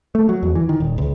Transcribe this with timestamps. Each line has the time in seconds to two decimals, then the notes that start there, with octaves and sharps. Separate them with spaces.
0.15 A3
0.29 F#3
0.43 E2
0.55 E3
0.69 D#3
0.80 D#1
0.98 C#2